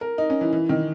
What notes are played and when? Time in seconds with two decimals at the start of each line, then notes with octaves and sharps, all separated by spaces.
0.01 A#4
0.18 D#4
0.30 C#4
0.41 E3
0.53 E3
0.69 D#3